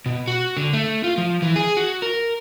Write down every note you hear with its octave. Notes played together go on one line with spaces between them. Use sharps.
B2
F#4
D3
A3
F4
F3
E3
G#4
F#4
A#4